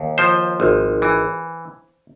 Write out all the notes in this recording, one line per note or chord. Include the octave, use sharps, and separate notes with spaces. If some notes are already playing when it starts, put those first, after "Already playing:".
Already playing: D#2
F3 C5
G#1
E3